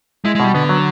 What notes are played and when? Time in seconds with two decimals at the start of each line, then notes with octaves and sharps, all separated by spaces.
0.25 G#3 E4
0.35 G#3
0.40 B2 G3
0.54 D3 B3
0.69 F#3